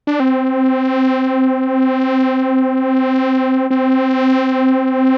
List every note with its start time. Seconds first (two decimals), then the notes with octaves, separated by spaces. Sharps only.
0.07 D4
0.20 C4
3.71 C4